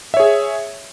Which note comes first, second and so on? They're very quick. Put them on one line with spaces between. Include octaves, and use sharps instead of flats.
E5 C#5 G#4